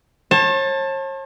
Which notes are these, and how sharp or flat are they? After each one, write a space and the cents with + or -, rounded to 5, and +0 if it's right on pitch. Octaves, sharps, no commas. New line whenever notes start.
C#5 -45 A5 +10